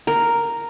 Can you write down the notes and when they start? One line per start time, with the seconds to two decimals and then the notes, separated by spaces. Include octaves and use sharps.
0.07 A#4